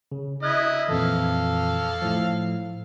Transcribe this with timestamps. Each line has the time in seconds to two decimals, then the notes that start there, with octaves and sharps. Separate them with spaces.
0.12 C#3
0.43 E4 D#5 F6 F#6 G#6
0.88 F2 A#2 E3 A4 F5
2.02 A2 F3